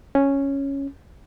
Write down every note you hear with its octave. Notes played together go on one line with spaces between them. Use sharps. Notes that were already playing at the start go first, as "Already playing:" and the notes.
C#4